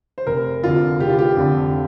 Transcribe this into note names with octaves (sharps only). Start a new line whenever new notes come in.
C5
F1 A#4
F2 D3 F4
F1 G4
F4
G4
F2 D3